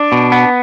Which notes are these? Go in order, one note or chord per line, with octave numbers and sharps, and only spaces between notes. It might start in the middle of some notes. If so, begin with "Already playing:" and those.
Already playing: D4
B2
B3